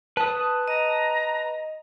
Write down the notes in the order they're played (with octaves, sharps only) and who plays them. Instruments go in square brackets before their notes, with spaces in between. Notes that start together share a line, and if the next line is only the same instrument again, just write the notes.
[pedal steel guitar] B4 D#6 [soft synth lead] A5
[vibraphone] D#5 [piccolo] A#5